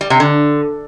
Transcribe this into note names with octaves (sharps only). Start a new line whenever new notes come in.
G3
C3
D3